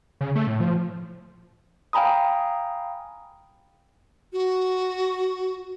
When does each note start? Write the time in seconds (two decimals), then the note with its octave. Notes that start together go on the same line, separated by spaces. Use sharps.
0.21 C#3
0.35 A3
0.47 A2
0.60 F3
1.93 F5 G5 G#5 A#5 B5 D#6
4.33 F#4